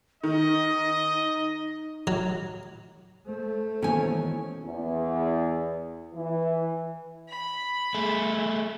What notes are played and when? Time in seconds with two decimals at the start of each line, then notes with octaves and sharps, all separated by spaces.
0.24 D#3 D#4 D#5
2.07 F#3
3.26 A3 C5
3.82 D#2 B2 E3 C#4 G#5
4.65 E2
6.15 E3
7.27 B5
7.94 A3 G#4